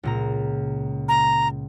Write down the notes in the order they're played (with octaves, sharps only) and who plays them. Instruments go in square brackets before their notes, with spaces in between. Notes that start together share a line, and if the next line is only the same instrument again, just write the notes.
[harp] C#2 A#2 A#5
[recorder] A#5